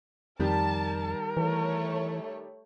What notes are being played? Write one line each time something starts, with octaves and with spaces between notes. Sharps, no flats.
F2 D#3 G3 G4 A#4 A5
E3 A3 C#5